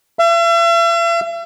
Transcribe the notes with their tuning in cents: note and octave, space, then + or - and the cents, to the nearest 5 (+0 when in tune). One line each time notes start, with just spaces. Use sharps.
E5 +45